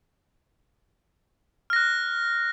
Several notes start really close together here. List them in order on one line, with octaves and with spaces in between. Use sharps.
F6 A#6 F#6